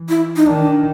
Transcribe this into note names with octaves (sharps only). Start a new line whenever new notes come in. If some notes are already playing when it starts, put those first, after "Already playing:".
Already playing: E3
E4
D#4
D#3 D4